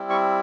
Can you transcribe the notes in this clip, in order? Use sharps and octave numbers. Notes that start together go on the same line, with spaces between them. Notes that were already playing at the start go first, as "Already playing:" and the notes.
Already playing: G3 C4 E4
C#6